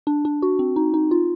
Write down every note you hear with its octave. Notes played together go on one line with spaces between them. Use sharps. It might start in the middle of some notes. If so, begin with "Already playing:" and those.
D4
D4
F#4
C4
D#4
D#4
F4